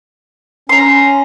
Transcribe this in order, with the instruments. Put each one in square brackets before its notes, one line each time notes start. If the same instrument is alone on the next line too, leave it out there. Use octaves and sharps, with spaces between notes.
[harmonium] C#4 [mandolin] A#5 C6